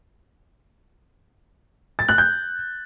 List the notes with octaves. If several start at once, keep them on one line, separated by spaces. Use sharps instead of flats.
A6
F#6
G6